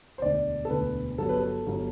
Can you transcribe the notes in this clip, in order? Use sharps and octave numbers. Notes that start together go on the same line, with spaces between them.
C5
E1 D2 D3 D5
A4
E1 D2 D3 B4
G1 G2 F#3 A4
B4
A4
G1 G2 F#3